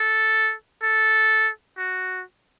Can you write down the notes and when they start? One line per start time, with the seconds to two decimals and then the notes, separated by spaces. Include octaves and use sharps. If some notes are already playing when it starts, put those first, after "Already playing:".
Already playing: A4
0.82 A4
1.78 F#4